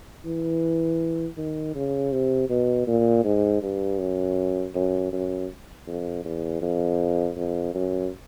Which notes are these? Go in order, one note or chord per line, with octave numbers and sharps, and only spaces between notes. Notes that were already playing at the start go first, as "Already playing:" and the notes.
E3
D#3
C#3
C3
B2
A#2
G#2
G2
F#2
F#2
F#2
F2
E2
F2
F2
F#2